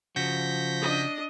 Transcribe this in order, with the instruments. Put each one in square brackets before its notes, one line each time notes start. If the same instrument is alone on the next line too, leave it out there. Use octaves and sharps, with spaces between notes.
[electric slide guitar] C#3 F#4 [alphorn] F3 [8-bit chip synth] G6 A#6 B6
[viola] D4 D#5